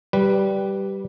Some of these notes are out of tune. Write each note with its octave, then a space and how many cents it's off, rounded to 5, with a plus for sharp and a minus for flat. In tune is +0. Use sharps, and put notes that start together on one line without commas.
G3 -10 B4 +0